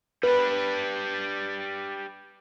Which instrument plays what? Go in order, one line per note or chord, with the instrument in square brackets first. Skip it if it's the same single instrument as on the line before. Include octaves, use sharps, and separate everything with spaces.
[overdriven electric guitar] G3 D4 [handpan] B4